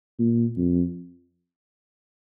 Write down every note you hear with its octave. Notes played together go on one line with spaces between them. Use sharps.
A#2
F2